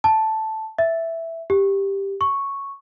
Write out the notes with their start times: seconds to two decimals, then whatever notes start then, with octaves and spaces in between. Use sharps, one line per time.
0.04 A5
0.78 E5
1.50 G4
2.21 C#6